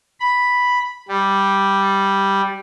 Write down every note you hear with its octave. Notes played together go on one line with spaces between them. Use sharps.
B5
G3